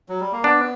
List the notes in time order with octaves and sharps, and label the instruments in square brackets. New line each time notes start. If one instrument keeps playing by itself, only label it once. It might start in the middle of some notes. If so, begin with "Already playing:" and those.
[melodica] F#3
G3
A#3
[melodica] B3 [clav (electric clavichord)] D4